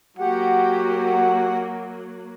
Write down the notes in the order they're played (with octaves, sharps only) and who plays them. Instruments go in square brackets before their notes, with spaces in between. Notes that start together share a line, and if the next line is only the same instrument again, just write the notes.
[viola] F#3 A#3 [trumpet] F#4 [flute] G4 [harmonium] F#5